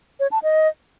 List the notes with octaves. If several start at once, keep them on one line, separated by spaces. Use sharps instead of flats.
C#5
A5
D#5